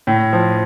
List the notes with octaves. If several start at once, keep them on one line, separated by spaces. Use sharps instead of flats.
A2
F3